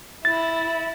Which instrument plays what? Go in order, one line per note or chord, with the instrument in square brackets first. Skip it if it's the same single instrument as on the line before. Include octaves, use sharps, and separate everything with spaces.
[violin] E4 [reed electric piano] A6